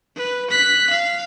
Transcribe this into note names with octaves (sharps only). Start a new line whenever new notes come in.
B4
F#6 B6
F5